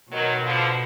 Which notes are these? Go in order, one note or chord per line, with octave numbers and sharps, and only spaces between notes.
B2 D#3 F#3
D3 F3